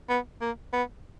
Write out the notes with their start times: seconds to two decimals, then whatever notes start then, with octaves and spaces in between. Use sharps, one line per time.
0.10 B3
0.41 A#3
0.73 B3